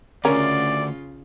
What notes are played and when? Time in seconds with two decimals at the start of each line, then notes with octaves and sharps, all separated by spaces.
0.25 D2 C#3 C#4 F4 A#4 D5